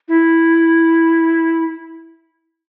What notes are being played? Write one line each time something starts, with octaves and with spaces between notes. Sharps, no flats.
E4